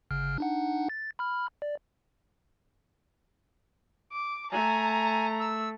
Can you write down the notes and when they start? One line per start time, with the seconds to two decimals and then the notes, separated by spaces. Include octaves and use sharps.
0.11 G1 C#3 F6
0.38 D4 D#4 F#5
0.89 A6
1.19 B5 F6
1.62 D5
4.13 D6
4.51 A3 G#5 A#5
5.40 E6